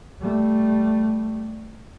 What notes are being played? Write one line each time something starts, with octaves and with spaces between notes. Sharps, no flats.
G3 A3